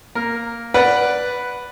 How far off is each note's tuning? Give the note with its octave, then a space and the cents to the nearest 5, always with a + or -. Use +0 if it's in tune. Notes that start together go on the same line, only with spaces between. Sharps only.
A#3 +0 A#4 +0
B4 +0 D5 +0 F#5 +0